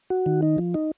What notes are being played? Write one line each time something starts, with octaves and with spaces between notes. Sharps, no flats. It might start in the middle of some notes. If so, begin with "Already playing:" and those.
F#4
D#3
D#4
F3
D#4